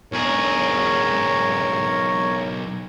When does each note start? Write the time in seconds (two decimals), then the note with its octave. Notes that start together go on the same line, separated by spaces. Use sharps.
0.12 B1 G#4 A#4 C#5